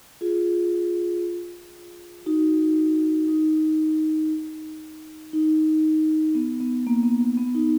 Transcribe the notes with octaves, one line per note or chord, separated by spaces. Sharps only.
F4 G#4
D#4 F#4
D#4
D#4
B3
B3
A#3
B3
A#3
B3
D#4